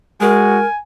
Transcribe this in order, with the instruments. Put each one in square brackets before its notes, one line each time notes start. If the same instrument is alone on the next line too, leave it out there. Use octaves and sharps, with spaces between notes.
[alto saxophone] G#3 [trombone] F#4 [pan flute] A#4 [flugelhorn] G#5